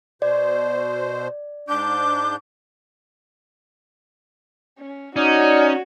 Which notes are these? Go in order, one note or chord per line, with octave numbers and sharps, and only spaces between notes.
B2 C5 D5
G#2 D4 D6 G6
C#4
C#4 D#4 F#4 D5